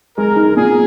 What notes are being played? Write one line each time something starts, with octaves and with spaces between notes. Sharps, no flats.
G#3 A#4
D#4
A#2 G#4